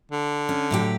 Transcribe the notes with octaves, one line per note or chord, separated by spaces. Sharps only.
D3
C#4
A2 F#3 G4